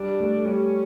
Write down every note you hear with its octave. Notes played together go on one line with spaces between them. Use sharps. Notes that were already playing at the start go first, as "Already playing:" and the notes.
Already playing: G3 D4
A3
G3 C#4